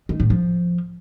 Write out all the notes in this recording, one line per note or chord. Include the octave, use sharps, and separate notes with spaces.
D#3
A2
F3